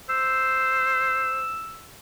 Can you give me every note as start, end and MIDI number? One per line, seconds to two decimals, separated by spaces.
0.09 1.54 72
0.09 1.88 88